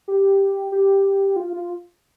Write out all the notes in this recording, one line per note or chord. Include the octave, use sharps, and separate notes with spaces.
G4
G4
F4
F4